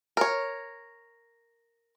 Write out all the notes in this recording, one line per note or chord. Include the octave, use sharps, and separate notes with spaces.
A#4 C#5